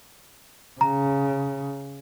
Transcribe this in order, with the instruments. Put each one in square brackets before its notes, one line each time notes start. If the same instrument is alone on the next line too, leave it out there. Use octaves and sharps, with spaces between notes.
[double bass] C#3 [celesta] A#5